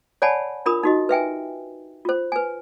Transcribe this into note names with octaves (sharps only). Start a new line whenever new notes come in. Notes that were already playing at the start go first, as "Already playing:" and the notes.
C#5 D5 F#5 G#5 A5 B5
D4 F4 A#4 B5 D#6
D#4 F#4 D#5
B4 E5 G5 G#5
F4 C5
B4 G#5